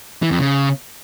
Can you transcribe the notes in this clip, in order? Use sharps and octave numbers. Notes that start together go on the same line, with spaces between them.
E3
F2
C#3